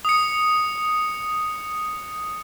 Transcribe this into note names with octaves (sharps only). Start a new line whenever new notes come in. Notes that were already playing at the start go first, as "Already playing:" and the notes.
D#6 C#7